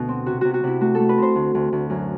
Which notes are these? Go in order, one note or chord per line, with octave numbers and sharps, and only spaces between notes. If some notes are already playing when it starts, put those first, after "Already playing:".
Already playing: D2 B2
C4
C3 F#4
C3 F#4
F#4
C3 E4
A3 F#4
A3 A4
B4
C4 C5
D2
D2
D2
F#2